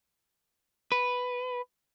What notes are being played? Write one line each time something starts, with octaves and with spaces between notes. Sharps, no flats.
B4